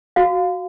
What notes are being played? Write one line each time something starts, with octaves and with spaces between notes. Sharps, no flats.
F#4 F5